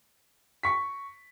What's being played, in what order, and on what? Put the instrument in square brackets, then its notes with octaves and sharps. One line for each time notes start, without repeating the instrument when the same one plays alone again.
[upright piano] C#6 B6